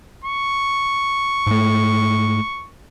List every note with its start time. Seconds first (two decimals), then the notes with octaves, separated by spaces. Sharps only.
0.24 C#6
1.47 G#2 A3